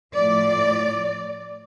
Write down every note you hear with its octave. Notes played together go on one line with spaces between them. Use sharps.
A2 F3 A3 D5